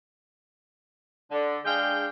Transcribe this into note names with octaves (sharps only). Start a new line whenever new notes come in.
D3
G#3 D4 G#4 F5 G5